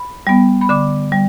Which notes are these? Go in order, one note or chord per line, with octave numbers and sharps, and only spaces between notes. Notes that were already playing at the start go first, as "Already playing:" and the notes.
Already playing: B5
G3 B3
B5
D3 D6
G3